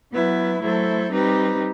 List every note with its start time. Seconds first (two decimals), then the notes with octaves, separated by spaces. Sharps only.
0.12 F#3 B3 E4 B4
0.61 F#3 A3 E4 A4 C5
1.10 G3 C4 D#4 G4 B4